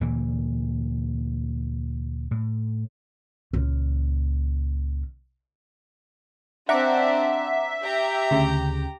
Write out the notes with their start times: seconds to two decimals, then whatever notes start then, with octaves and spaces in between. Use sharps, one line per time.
0.01 D2 A#2 E3 A#3
2.31 A2
3.53 C#2 A#2
6.69 C4 D4 E5 F#5 A#5 D6
7.83 G4 G5 A#5
8.31 D2 C#3